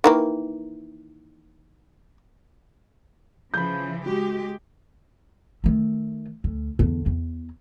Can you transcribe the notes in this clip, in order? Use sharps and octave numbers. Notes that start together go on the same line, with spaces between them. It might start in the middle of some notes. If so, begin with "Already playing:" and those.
D#3 E3 A#3
C#3 E3 F3 B5 G6
G#3 F#4 G4
D#3 A3
D2
E2 D3
E2